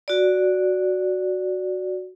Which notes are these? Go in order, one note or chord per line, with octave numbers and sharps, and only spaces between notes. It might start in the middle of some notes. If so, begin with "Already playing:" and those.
F#4 D5